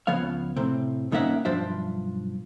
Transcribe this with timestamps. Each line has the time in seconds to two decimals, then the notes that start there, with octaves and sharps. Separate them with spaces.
0.07 C#2 F3 B3 C#5 F5
0.56 A2 C3 C4
1.12 G2 D#3 A#3 C#4 E5 F#5
1.45 B1 G2 F3 D4 C5 E5